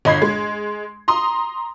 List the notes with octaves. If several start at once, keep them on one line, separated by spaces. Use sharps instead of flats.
G1 D#5 B5 G#6 C7
G#3
A#5 C6 D#6